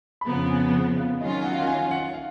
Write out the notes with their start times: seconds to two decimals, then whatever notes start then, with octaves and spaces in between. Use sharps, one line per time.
0.21 B5
0.26 F2 C#3 F3 B3 A#5
0.50 G#5
0.74 F#5
0.97 F5
1.20 D#3 F#3 C#4 F4 D#5
1.44 F#5
1.51 F5
1.58 F#5
1.67 G#5
1.91 F#5
2.14 F5